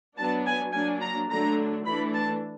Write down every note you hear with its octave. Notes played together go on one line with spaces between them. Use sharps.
F#3 B3 D4 A5
G#5
F#3 A#3 D4 G#5
A#5
D3 F#3 A3 D4 A#5
E3 A3 D4 B5
A5